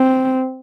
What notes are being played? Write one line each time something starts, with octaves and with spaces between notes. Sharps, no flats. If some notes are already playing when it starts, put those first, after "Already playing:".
Already playing: C4